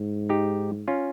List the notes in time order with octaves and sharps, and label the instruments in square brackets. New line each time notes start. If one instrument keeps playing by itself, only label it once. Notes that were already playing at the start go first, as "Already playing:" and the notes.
Already playing: [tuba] G#2
[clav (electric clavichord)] D#4 G4
C#4 F4